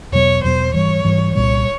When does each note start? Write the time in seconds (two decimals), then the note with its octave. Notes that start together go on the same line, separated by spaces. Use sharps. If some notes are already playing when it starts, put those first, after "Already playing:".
0.12 E2 B2 F#3 B3 C#5
0.43 E2 B2 F#3 B3 C5
0.74 G#2 E3 G3 C#5
1.05 G#2 E3 G3
1.35 C2 A#2 G3 C#5